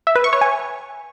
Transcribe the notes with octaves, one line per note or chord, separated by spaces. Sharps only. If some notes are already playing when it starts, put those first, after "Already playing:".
E5
B4
C#6
C#5
G#5